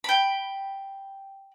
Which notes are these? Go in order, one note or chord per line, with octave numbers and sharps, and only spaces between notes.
G5 B5